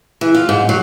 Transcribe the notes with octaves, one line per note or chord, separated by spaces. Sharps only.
E3
F4
G#2
F#3